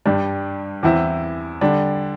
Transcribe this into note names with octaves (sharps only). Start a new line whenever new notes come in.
G2 G3 D4
E2 E3 C4 E4
D3 G3 D4